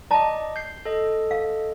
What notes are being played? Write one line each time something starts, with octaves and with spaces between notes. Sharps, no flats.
D5 D#5 A5 A#5
G6 C7
A4 D#5
F5